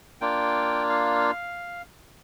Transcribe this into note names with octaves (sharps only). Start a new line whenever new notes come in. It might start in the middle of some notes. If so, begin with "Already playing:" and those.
A#3 D4 F4 G5
F5